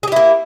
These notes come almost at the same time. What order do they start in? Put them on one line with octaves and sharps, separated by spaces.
G#4 G4 E4 A#3